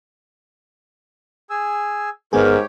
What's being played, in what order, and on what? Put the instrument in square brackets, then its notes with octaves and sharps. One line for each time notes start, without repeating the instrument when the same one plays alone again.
[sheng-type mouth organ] G#4 G#5 E6
[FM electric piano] G1 B3 G#4 [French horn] G#2 [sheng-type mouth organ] G4 C#5 G5 [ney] A#4